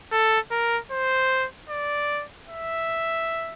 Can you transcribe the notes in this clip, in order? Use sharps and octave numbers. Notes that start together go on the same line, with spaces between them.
A4
A#4
C5
D5
E5